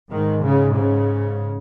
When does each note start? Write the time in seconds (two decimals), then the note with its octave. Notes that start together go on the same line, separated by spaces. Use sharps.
0.11 G#2 D#3
0.43 C#3
0.76 C#3